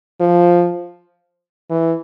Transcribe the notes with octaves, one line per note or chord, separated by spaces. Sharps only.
F3
E3